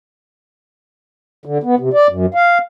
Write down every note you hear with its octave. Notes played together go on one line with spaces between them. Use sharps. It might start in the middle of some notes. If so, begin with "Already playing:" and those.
D3
B3
C3
D5
F#2
F5